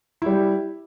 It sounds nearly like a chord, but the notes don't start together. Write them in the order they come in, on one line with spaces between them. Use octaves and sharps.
E4 G3 G4